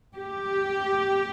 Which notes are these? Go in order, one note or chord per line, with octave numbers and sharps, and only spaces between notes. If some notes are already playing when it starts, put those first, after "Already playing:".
G4